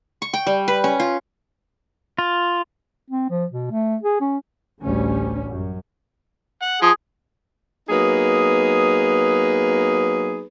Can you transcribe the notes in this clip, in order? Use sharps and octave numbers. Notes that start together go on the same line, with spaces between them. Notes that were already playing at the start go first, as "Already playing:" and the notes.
C#6
G5
G3
B4
C#4
F4
F4
C4
F3
B2
A3
G#4
C#4
A1 D2 G3 C#4
F#2
F#5
F3 G#4
F#3 A#3 B3 D#4 G#4 B4